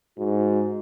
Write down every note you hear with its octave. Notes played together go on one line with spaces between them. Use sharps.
G#2 F#4